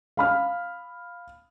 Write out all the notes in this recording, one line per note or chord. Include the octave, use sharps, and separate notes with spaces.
F5 B5 F6